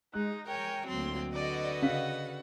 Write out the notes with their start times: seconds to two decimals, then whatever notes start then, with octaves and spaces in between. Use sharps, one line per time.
0.14 G#3 D#4 F#6
0.47 A#4 C#5 G5 G#5
0.88 D2 F#3 A#3 C4 C6
1.34 D3 F#4 B4 D5 D#5
1.82 C#3 F5 F#5 B6